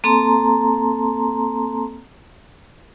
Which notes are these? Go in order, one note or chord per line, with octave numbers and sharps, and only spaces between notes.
A#3 C4 A4 A5 A#5 C6